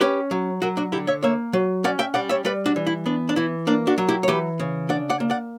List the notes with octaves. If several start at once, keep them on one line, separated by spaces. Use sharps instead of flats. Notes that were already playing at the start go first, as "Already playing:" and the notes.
C#4 G4 B4
F#3
F#3 F#4 A#4
D4 F#4
D3 E4 G4
C#5 E5
A#3 C#5 E5
F#3
C#4 D5 F#5
E5 G5
G3 D5 F#5
C#5 E5
G3 B4 D5
D4 F#4
E3
E4
B3 D4
D4
E3 E4
A#3 D4
D4 F#4
F#3
E4 G4
C#5
E3 G4 B4
C#3
D4 D5 F#5
D5 F#5
A#3
D5 F#5